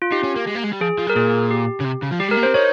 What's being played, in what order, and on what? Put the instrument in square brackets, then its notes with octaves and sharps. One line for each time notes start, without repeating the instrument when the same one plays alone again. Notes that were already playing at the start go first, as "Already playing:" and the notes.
[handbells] F4
[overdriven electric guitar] D#4 [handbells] G4
[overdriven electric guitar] C#4
A#3
G#3
A#3
G#3
G3
[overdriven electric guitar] F3 [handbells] G#4
[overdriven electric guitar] F3
G3
[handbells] A#4
[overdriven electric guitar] A#2 [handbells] G#4
[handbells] G4
[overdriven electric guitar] C#3
C3
C#3
F3
[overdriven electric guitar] G3 [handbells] G4
[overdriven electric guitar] G#3 [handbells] A#4
[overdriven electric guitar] A#3
[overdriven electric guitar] C4 [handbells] C5
[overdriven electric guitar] D#4 [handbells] C#5